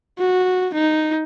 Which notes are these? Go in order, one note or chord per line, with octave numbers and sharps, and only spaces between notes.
F#4
D#4